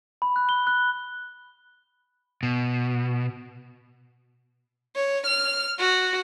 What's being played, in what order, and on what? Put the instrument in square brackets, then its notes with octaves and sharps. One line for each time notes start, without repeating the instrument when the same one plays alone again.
[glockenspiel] B5
F#6
G7
F#6
[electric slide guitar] B2
[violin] C#5
F6
F#4